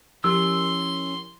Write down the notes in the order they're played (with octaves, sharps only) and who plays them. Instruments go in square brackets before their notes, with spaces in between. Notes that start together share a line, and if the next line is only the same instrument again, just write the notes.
[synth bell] F3 E4 G4 [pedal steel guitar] C#4 A#4 E6 [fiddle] C6